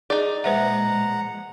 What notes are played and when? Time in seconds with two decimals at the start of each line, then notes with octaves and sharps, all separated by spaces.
0.10 D#4 G#4 D5
0.44 A#2 F3 G#3 B4 C5 E5 F#5 A#5